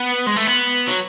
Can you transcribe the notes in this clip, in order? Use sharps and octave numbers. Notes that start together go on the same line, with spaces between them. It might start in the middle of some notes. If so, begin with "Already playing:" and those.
Already playing: B3
G#3
A3
B3
F#3